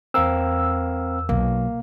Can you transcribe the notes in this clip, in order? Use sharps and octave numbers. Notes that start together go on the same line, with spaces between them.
E2 C4 A#4 F5 E6
B1 A#3